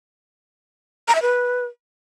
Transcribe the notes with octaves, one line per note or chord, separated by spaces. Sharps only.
A#5
E5
B4